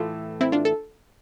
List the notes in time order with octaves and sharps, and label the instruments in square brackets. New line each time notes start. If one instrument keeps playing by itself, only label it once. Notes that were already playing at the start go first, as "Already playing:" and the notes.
Already playing: [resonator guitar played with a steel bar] A2 E3 A3 [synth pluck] F4 A4
[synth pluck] C4 E4
D4 F4
A4